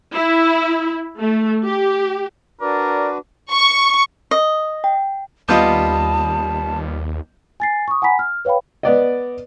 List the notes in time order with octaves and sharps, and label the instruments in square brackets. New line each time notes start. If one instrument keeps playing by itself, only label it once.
[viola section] E4
A3
G4
[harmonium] D4 F#4 B4 [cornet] A#4 [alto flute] D5 [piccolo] D6
[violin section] C#6
[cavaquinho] D#5
[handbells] G5
[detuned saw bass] D#2 [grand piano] G3 G6 [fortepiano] B3 F4 D#5 [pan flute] A5
[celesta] G#5 A6 C7
C#6 D#6
F#5 G#5 A#5 B5 B6
F6
B4 C#5 F5 G5 B5
[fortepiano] B3 D5 D#5